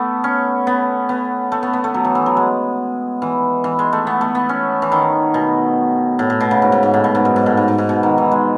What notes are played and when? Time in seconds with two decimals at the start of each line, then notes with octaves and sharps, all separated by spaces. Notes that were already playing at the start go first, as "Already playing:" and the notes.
Already playing: A3 B3
0.24 C#4
0.67 B3
1.09 B3
1.52 A3
1.63 B3
1.73 B3
1.84 A3
1.94 F#3
2.04 E3
2.15 E3
2.26 F#3
2.37 G#3
3.22 E3
3.64 E3
3.79 G#3
3.93 A3
4.07 B3
4.21 A3
4.35 B3
4.49 C#4
4.82 E3
4.92 D#3
5.34 B2
6.19 A2
6.30 A2
6.41 B2
6.51 C#3
6.62 G#2
6.72 G#2
6.83 G#2
6.94 A2
7.04 B2
7.15 G#2
7.25 F#2
7.36 G#2
7.46 A2
7.57 G#2
7.68 G#2
7.78 G#2
7.89 B2
8.03 D#3
8.18 E3
8.31 G#3